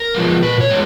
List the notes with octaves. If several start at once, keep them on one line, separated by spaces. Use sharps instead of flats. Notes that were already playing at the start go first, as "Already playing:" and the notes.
Already playing: A#4
F3 G#3 B3
A#2 B4
C#5
G#3 B3